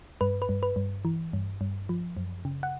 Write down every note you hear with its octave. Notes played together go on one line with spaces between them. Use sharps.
G2 B4
B4
G2
B4
G2
E3
G2
G2
F3
F#2
C#3
F#5